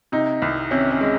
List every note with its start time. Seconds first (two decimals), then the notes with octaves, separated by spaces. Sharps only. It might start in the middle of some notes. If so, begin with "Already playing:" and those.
0.12 C3 D#4
0.42 C2
0.71 C3 C#4
0.91 C#4
1.01 G#3